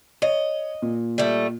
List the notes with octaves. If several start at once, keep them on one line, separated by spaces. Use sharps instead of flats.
C#5 D#5
A#2
G3 A3